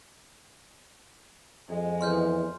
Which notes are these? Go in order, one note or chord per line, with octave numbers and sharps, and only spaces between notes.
F2 G#3
E2 C6 F6 G6